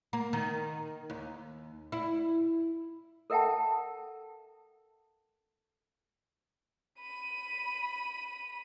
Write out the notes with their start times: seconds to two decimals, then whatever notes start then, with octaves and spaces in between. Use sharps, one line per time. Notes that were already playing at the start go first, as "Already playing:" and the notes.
0.13 A#3
0.33 D#3
1.10 D#2
1.92 E4
3.30 A4 A#4 E5 F#5 G5 A5
7.01 B5 D#7